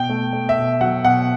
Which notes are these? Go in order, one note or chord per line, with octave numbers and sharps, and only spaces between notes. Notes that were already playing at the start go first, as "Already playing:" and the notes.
Already playing: B2 G5
A3
A3
E5
B2
F#3 F#5
B2 F#5